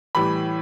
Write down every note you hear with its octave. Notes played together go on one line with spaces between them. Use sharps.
A2 E3 G3 B5